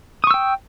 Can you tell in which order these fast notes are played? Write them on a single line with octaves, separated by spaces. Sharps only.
D#6 C#6 E6 G5